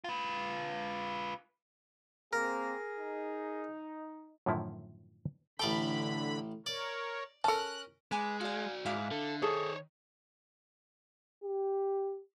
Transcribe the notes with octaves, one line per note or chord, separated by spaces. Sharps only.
F4 B4
A#3 C4 G#4 A#4
D#4
F#2 A2 D3 D#3 F3 E4
A1 D3 A4 D5 G5 B5
A#4 C#5 D5
C#4 A4 A#4 A5 F#6
G#3 B4 G#5 D6
F#4 D5 F5 G#5
G#2 E4 F5 D6
D3 A4
D#3 G#4 A4 C5 C#5
G4